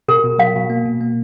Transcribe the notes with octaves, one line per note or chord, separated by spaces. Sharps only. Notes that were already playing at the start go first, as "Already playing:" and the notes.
B2 A#4
B2
F#3 F5
B2
A#3
B2
A#3